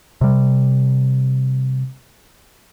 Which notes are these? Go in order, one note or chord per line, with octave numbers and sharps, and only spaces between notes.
C3 G3